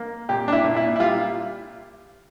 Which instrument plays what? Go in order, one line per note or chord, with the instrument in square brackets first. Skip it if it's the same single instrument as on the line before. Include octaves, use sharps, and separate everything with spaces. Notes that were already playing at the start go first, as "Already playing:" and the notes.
Already playing: [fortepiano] A#3
A#2 G4
D4
E4
A#2
E4
E4
G3 F4